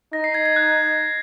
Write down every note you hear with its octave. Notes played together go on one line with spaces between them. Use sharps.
D#4 A#6
C7
G#6
G#6
F#6